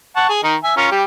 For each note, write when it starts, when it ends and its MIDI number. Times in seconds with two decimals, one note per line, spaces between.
0.16 0.29 78
0.16 0.29 81
0.16 0.29 85
0.29 0.43 68
0.43 0.56 51
0.43 0.56 63
0.64 0.74 76
0.64 0.74 80
0.77 0.88 61
0.77 0.88 65
0.77 0.88 70
0.91 1.04 55
0.91 1.04 67